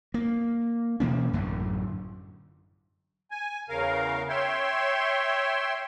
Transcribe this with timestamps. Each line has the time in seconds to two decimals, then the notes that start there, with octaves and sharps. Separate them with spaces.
0.14 A#3
1.00 B2 E3 A#3 C#4
1.33 A1 F#2 D3
3.31 G#5
3.69 E2 C#3 A#4 F5
4.29 C#5 E5 G5 C6